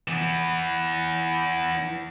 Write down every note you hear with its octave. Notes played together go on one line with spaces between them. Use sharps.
E3 B3